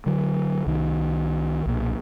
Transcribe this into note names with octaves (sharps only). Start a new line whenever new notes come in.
D3 F#3
C2 D#3
B1 A#2